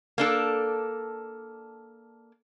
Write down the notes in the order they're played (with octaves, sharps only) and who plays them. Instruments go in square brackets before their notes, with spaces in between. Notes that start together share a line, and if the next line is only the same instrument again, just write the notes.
[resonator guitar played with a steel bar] A#3 D4 A4